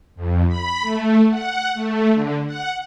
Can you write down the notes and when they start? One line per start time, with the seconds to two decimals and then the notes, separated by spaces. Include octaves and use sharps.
0.16 F2
0.48 B5
0.81 A3
1.29 F#5
1.74 A3
2.12 D3
2.46 F#5